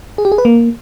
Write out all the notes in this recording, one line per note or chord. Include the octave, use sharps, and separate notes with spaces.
G#4
G4
G#4
B4
A#3